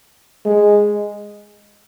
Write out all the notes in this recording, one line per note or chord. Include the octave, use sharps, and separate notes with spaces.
G#3